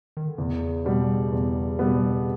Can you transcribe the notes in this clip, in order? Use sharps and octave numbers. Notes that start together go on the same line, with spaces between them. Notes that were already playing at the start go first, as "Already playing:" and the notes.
D#3
D3
E2 C#3
B2 G3 B3
E2
B2 G3 B3